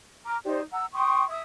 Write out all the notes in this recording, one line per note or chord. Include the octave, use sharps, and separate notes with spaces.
A#5 D6 F6
D#4 G4 C5 D5
F#5 A#5 E6
G5 C6 C#6 D#6
E5 D#6